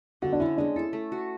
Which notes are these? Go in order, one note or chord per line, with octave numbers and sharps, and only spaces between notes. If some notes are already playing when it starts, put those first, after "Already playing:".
D3 F#4
D4
C#4 E4
G#3 D4
E4 A4
A3
F#4